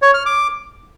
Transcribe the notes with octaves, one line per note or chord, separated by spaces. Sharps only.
C#5
F6
D6